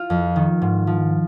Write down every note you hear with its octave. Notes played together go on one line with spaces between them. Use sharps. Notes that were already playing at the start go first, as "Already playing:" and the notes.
Already playing: F4
F2
D#3
G#2
F3